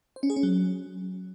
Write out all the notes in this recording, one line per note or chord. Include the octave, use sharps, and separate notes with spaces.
C5
C#4
G#4
C#4
F#3